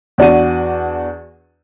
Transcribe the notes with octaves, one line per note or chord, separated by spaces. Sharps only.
E2 D4 F#4 D#7